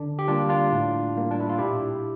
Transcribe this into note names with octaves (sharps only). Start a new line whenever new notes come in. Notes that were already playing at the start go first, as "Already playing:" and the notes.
Already playing: D3 D4
G4
G3 A#3 D4 F4
D4 F4
A2
G3 A#3
D4
E4
F4
A#2 E4 G4